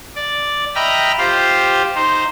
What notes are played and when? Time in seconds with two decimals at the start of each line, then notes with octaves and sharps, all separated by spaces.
0.16 D5
0.75 D#5 E5 G5 A#5 B5 F6
1.18 F4 G4 C5
1.95 D#4 C5